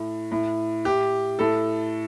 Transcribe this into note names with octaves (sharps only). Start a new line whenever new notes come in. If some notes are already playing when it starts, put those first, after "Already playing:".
Already playing: A2
A2
A2 G4
A2 A4